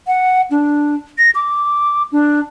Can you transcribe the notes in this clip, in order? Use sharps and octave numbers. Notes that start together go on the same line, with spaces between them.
F#5
D4
A#6
D6
D4